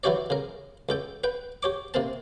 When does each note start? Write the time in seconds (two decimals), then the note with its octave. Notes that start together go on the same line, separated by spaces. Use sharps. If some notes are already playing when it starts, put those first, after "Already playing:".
0.04 E3 F#3 E4 G4 C#5 D5
0.30 C#3 A#4
0.89 C#2 A4 G5
1.24 B4 G5
1.63 G4 C#5 D6
1.94 C3 A#3 C4 A5